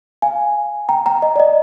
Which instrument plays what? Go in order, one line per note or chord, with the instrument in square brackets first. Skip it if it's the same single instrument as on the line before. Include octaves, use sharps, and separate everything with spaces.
[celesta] F5 G#5
G5 A#5
G5 A#5
D#5
D5
D#5